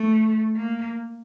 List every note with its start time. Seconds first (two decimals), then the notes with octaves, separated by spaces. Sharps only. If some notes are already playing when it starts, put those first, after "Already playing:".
Already playing: A3
0.56 A#3